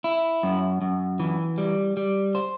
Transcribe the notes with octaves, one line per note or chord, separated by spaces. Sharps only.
E4
F#2
F#2
E3
G3
G3
C5